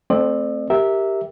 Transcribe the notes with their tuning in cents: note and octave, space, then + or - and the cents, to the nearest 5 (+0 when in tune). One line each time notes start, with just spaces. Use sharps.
A3 +0 C4 +0 D5 +40
G4 +0 A#4 -5 E5 -15